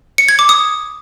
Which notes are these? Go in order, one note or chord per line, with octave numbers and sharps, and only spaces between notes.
C#7
G#6
D6
D#6